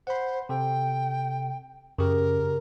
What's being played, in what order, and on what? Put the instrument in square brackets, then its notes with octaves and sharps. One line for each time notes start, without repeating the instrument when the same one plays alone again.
[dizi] C5 [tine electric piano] F#5 B5
[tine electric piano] C3 A4 [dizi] G5
[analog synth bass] F#2 [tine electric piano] C#3 G4 [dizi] A#4